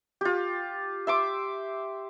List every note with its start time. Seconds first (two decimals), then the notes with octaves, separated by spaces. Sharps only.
0.21 F4 G4
1.07 E5 C6 D6